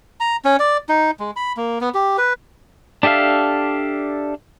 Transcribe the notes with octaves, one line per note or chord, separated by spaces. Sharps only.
A#5
C#4
D5
D#4
G#3
B5
A#3
B3
G4
B4
D4 G4 A4 E5 F5